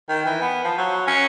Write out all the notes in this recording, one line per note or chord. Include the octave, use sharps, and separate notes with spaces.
D#3
E3
B3
F3
F#3
C#4